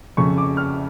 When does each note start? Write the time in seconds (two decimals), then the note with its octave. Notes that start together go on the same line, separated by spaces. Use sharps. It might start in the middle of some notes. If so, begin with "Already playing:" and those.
0.17 F2 C#3 C#6
0.38 D6
0.57 F6